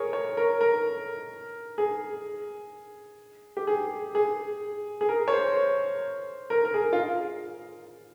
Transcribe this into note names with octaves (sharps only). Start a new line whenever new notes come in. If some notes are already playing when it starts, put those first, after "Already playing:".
Already playing: G#4 A#4 C#5
C#5
A#4
A#4
G#4
G4
G#4
G#4
G#4
A#4
C#5
C5
A#4
A#4
G#4
F4